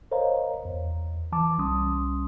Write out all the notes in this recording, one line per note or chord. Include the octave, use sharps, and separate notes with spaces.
A#4 C5 C#5 D#5 F5 A#5
E2
E3 A5 D6
C2 G3 C#4 C6 D#6